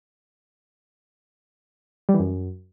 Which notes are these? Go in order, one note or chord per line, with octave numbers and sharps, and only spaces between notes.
G3
E3
F#2